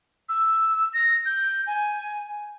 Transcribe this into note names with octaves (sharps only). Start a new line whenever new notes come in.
E6
A#6
G6
G#5